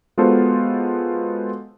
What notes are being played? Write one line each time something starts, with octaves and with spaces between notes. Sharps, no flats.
G#3 B3 F4 F#4 A4 C5